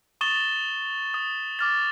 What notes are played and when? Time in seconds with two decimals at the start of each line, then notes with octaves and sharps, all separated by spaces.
0.21 C#6 D#6 A6 E7 G7
1.14 D#6
1.59 D6 F6 A6